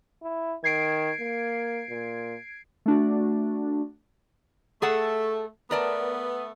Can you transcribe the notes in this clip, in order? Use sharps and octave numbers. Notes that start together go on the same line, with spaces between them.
E4
D#3 G#6 C7 D7
A#3
A#2
A3 D4 F#4
A3 G#4 A4 F#5
A3 B3 A#4 D5 A5